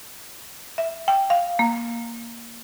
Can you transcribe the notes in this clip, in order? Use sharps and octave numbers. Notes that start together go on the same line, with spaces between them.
E5
G5
F5
A#3